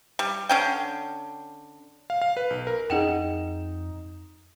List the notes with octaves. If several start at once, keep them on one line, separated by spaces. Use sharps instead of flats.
G3
D3 C#4 G5
F5
F5
B4
B1
A#4
F2 D#4 G#4 F#5 G5 E7